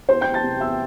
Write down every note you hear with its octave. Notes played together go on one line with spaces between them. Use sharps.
E2 C5 C6
E2 G5 G6
A5 A6
C3
E2 E5 E6